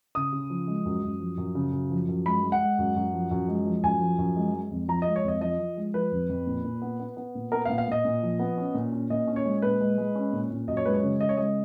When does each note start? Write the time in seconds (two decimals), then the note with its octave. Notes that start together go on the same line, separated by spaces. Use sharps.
0.15 C#3 D#6
0.33 C#3
0.50 F3
0.67 G#3
0.85 F#2
1.03 F#2
1.20 F3
1.38 F#2
1.55 C#3
1.72 F#2
1.90 F3
2.08 F#2
2.25 G#3 B5
2.43 G#3
2.52 F#5
2.61 G#3
2.78 F#2
2.96 F#2
3.14 F3
3.31 F#2
3.48 G#3
3.66 F3
3.83 F#2 G#5
4.01 F3
4.18 F#2
4.36 G#3
4.54 G#3
4.71 F2
4.88 F3 A#5
5.02 D#5
5.07 G#3
5.16 C#5
5.24 F2 D#5
5.41 F3 D#5
5.59 F3
5.77 G#3
5.94 F3 B4
6.12 F2
6.29 F2
6.47 A#2
6.64 A#2
6.82 B3
7.00 B3
7.17 B3
7.35 A#2
7.52 B3 A#4
7.65 F5
7.69 A#2
7.78 F5
7.87 A#2 D#5
8.05 A#2
8.23 F3
8.39 B3
8.57 C#4
8.75 A#2
8.92 C#4
9.10 A#2 D#5
9.27 C#4
9.36 C#5
9.45 G#3
9.62 A#2 B4
9.81 G#3
9.98 G#3
10.15 C#4
10.33 A#2
10.51 A#2
10.67 F#2 D#5
10.77 C#5
10.85 G#3 B4
10.94 C#5
11.03 C#3
11.21 C#3 D#5
11.29 C#5
11.37 G#3 D#5